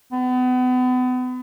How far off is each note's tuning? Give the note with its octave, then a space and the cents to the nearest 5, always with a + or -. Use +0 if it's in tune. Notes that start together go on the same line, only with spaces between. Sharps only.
B3 +35